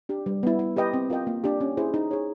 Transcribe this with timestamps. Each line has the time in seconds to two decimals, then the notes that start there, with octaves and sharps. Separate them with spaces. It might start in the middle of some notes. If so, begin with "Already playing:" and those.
0.09 D4 G4
0.26 G3
0.43 B3 E4
0.59 E4
0.76 G4 B4 D#5 G5
0.94 C4
1.10 F4 A#4 D#5 G5
1.27 A#3
1.44 D4 G4
1.60 C#4
1.77 E4 G#4 C5
1.94 D#4
2.11 G#4 C#5